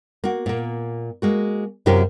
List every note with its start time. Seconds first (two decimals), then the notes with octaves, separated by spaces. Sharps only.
0.24 A#3 F#4
0.46 A#2 A#3
1.22 G#3 A#3 F#4
1.86 F#2 C3 F4 G4 A#4